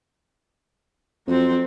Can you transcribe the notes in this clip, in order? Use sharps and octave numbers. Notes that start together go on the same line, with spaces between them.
F2 F#3 C4